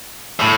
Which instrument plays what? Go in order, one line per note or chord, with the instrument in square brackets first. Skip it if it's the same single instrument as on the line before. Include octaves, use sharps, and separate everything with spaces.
[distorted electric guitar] A2